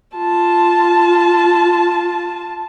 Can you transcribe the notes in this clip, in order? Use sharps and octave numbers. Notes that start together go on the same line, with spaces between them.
F4 A5